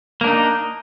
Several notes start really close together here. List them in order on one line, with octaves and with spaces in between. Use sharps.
A#3 D4 D#4